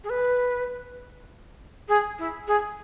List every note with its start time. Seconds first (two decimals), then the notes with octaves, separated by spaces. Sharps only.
0.04 G#4
0.10 B4
1.89 G#4
2.19 E4
2.48 G#4